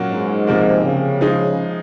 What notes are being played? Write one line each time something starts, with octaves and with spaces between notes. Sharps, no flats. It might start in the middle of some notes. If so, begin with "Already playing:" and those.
Already playing: A#2 F#3 A#3 C#4 F#4
G#2
C3 F3 A#3
C#3
F3 G#3 D#4 G#4